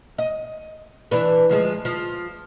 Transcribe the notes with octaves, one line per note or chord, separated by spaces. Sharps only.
D#5
E3 D4 B4
D2 F3 G#3
F3